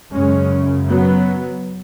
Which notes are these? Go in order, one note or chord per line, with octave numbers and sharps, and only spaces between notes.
F#2 C#3 G#3 C#4
F#3 B3